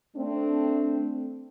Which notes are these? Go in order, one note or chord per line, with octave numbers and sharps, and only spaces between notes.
A3 C4 D4